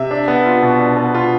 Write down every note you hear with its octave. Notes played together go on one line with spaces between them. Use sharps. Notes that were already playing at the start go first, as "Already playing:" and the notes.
Already playing: C3 E5
D4
B3
F4
B2
D4
B3
F4